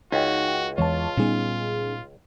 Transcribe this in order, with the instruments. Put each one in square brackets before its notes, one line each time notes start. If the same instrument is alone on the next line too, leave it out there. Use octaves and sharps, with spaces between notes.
[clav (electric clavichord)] C#2 [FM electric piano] D#4 G5 [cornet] F#4
[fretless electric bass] E2 E3 G#3 [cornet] F4 [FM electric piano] C#5 A5
[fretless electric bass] A#2 G3 B3 [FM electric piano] C#4 D#4 G#4